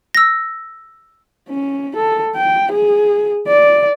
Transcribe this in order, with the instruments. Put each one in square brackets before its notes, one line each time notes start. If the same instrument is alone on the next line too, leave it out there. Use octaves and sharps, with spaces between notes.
[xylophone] E6 A#6
[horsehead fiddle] C#4
A4
G5
G#4
D5